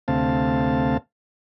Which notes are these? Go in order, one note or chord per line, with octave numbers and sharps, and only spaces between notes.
D2 C3 A3 C4 F5 A5